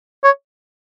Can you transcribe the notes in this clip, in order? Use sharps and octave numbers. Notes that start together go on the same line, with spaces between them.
C#5